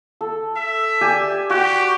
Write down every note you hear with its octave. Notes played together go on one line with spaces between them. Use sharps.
A4
E5
G4 D5 G#5
F#4 G4 G5